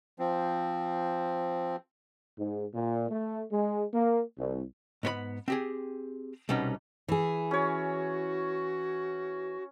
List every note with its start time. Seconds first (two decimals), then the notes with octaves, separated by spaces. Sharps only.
0.19 F3 C4
2.38 G#2
2.74 A#2
3.09 A3
3.51 G#3
3.93 A#3
4.38 C2
5.03 G#2 B3 C#5 B5
5.48 C4 G4 G#4
6.49 C2 B2 G3 B3 C#4 D#4
7.08 E3 G#4
7.51 C#4 F#4 C#5